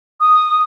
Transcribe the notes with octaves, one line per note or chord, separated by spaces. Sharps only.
D#6